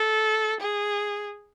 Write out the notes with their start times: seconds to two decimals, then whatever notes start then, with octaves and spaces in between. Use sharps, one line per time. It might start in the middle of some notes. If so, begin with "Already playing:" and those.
Already playing: A4
0.60 G#4